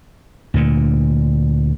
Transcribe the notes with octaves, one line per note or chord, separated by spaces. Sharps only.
D2 A#2 D3